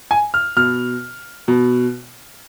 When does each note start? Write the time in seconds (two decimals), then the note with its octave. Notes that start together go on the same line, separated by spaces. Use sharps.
0.11 G#5
0.34 F6
0.57 B2 F6
1.48 B2